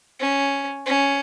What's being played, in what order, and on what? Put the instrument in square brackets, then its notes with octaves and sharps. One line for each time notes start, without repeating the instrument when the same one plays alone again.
[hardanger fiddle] C#4
C#4